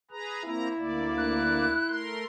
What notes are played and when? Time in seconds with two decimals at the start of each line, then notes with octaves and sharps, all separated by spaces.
0.11 G#4 B4 A#5
0.45 A#3 C4 E4 A#5
0.78 D2 A#3 D5
1.18 F#6
1.89 A3 A#4 C6